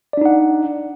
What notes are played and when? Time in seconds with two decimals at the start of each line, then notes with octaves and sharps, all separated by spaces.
0.13 D5
0.17 D4
0.21 D#4
0.26 F#5